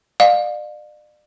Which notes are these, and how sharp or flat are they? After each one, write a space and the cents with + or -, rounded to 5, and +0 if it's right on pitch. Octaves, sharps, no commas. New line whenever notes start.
D5 +40 F5 +25